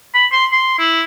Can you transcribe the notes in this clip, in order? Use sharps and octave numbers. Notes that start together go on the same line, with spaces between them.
B5
C6
C6
E4